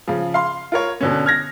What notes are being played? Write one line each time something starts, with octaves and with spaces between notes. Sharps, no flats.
C#3 F3
F5 C6
F4 A#4 C#5
B2 D3 C#4
F6 G#6 A#6